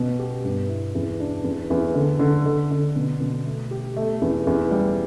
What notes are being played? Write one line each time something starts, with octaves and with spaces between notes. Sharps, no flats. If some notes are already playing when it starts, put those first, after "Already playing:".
Already playing: B2
G4
G2
E4
E2
D4
E2
E2
D3
D3
D3
D3
B2
B2
A3
G4
A3
E2
E2
G3